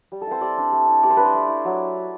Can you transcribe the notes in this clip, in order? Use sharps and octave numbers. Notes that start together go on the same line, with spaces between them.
G3
A4
C4 E4 C5
G3 D5
D4
A3
E4
G3 D5
C5
D4 B4
C5
A3
E4
F#3